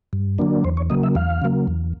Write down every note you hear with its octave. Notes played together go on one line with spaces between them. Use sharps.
G2
D3 F#3 A#3 D4
E2 C5
C#5
C#3 F#3 A#3 D#5
E5
E2 F5
C#3 F#3 A#3
E2